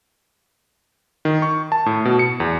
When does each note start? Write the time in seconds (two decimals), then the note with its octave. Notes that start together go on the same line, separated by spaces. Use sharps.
1.25 D#3
1.42 C#6
1.72 A5
1.86 A2
2.05 B2
2.19 C#7
2.40 E2